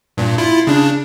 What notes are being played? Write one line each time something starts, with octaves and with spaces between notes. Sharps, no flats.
G2 A#2
E4 F4
C#3 D4